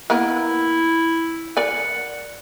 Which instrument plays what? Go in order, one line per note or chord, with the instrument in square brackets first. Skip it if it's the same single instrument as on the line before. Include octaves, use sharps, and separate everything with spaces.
[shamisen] A#3 B3 A#4 [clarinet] E4
[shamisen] A#4 D5 G#5 [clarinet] F#5